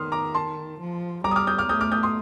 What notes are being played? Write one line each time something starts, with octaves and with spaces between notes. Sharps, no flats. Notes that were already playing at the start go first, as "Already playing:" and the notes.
Already playing: D#3 C6 D#6 F6
A#5 D6
A5 C6
F3
G3 A#5 D6
D#6
D6 F6
D#6 G6
D6 F6
A3 D#6 G6
D6 F6
D#6 G6
C6 D#6